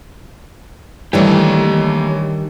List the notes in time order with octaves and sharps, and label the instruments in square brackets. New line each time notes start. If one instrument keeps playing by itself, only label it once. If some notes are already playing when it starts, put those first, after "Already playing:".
[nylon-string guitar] D#3 G3 D4 [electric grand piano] E3 A3 [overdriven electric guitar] G4 C#5